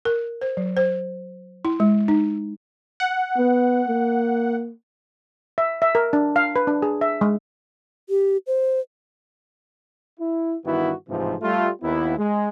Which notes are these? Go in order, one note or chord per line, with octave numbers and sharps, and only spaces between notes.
A#4
C5
F#3
C5
E4
G#3
D#4
F#5
B3
A#3
E5
E5
A#4
D4
F5
B4
D4
G#4
E5
G#3
G4
C5
E4
G2 D#3 E3 B3 E4 F#4
A1 G#2 C3 E3 F3
G3 A3 F4
D#2 B3 E4
G#3